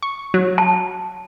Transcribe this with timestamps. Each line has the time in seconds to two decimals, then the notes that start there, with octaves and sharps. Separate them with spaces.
0.03 C#6
0.34 F#3
0.58 A5